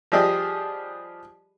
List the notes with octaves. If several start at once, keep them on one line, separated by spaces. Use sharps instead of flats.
F3 G3 D4 G4 G#4 D#5